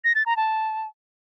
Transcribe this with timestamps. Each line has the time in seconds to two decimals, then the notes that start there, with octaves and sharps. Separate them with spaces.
0.04 A#6
0.15 A6
0.26 A#5
0.37 A5